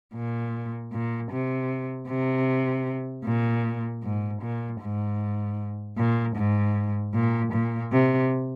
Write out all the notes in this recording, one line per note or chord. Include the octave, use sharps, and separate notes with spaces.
A#2
A#2
C3
C3
A#2
G#2
A#2
G#2
A#2
G#2
A#2
A#2
C3